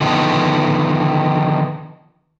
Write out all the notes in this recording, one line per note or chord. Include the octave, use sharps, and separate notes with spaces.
D3 D#3 F3 B3